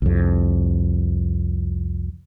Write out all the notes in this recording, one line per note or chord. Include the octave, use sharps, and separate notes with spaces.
C2 F2